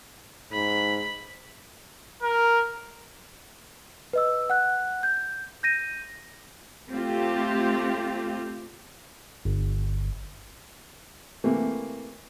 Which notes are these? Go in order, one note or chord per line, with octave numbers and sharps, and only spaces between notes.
G#2 B5
A#4
B4 D#5 E6
F#5 F#6
G6
G6 A#6 D#7
A3 C4 F4 G4
G1
C3 E3 A3 A#3